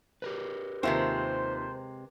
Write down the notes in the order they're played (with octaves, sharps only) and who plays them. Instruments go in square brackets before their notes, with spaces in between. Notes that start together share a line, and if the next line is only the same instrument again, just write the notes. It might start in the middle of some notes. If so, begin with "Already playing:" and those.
[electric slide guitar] G4 A#4 B4
[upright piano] D#2 F4 E5 [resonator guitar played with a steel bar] C3 G#3 C4 [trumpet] C5